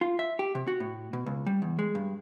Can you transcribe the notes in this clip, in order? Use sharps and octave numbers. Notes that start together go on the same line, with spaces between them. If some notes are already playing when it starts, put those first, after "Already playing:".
F4
E5
G4
C3
F#4
A2
B2
C#2
G3
E2
G#3
G2